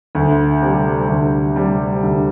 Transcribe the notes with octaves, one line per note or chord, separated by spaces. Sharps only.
D2
C3 G3
D2
C3 G3
D2